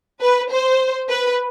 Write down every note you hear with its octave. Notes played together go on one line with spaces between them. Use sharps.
B4
C5
B4